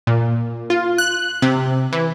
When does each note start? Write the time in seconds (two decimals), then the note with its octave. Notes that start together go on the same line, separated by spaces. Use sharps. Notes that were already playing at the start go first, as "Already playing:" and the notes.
0.07 A#2
0.70 F4
0.98 F#6
1.42 C3
1.92 E3